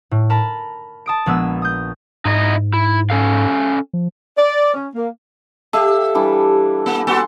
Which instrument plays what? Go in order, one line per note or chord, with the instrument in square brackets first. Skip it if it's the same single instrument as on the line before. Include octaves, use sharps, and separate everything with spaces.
[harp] A2
A#4 A5 B5
A5 D#6 D7
A#1 G#3 B3 E6
D#6 G6
[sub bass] G#2 [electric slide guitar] D#4 E4 D#5
[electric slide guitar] E4
C#4 A4 F5
[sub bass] F3
[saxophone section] D5
C#4
A#3
[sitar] G4 [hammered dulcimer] A4 E5 F5
[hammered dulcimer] E3 G3 D4
[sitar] A#3
[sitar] A#3 F#4 A4 [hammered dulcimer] G#5 C6